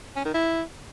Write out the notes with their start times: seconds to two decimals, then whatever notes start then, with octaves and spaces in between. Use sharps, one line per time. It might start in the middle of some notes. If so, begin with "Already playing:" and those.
0.16 C#4
0.25 D#3
0.34 E4